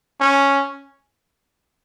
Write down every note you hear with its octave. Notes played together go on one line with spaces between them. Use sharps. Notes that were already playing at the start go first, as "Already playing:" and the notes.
C#4